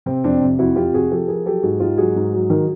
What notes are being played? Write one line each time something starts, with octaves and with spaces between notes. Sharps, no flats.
C3 C4
F2 C4 D4
C3
F2 E4 F#4
F2 F4 G4
C3 F#4 G#4
F3 G4 A4
F3 G#4 A#4
F#3 G4 A4
G#2 F#4 G#4
G#2 F4 G4
F#3 F#4 G#4
G#2
F#3
D#3